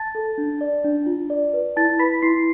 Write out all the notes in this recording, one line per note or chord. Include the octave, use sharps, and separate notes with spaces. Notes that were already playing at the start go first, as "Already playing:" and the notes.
Already playing: A5 A6
A4
D4
D5
D4
F4
D5
B4
E4 A5 A6
B4 B5 B6
E4 C6 C7